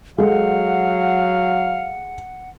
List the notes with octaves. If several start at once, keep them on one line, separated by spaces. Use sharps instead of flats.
F#3 G#3 A4 F5 F#5